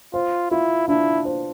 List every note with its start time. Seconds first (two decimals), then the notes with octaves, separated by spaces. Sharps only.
0.14 F4 C5
0.51 E4 F4
0.88 D4 E4
1.25 C5